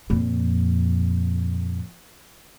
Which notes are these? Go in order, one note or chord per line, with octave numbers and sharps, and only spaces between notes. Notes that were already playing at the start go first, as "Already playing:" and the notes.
F2 A#2